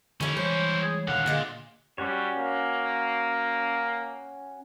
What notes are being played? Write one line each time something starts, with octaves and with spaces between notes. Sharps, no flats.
D3 D#3 F3 G3 A3 C#4 E4
E3 G3 G#3 C5 C#5
G#4
D#1 D3 F5 F#5
D2 A#2 D3 G#3 F4
G3 C#4 F#4 C#5
A#3